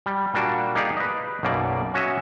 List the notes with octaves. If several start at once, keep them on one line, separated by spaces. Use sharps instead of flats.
G3
A#2 G3 A#3 D4 F#4
A#3 D#4 G4 G#4 D5
B4 D#5
B1 F#2 B2 A#3 D5
C#4 F#4 C#5 D#5 E5